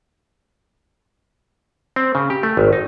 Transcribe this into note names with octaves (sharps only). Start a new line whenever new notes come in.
C4
C#3
G4
A3
G#1
D#4